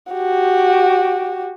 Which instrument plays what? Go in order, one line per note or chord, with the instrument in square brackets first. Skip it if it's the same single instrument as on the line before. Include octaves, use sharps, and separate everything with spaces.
[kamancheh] F#4 G4